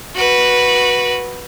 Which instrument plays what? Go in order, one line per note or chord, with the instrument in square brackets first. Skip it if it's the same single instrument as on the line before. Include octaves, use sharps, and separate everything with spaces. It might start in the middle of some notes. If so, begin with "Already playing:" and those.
[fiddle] F#4 B4